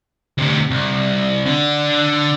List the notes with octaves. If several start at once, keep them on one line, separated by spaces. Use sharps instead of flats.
D2 C3
C2
D3 D4